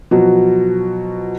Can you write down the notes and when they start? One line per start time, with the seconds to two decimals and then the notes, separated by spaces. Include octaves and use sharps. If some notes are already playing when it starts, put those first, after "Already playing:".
0.11 B2 F3 F#3